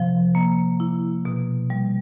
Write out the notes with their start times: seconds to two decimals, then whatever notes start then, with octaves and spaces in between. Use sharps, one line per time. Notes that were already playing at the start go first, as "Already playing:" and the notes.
Already playing: C3 F3
0.35 A#3
0.80 E4
1.25 B2
1.70 G3